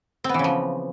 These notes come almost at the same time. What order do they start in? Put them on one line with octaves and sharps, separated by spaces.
C4 B3 E3 C#3 F3